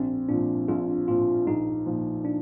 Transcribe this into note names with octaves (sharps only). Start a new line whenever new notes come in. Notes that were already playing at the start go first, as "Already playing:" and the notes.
Already playing: A#1 C4
A#2 F3 D4
A#1 F4
A#2 F3 F4
A#1 D#4
A#2 F3
D4